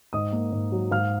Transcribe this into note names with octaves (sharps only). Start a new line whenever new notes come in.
G#2 D#5 D#6
A#3
G#2
F#3
G#2 F5 F6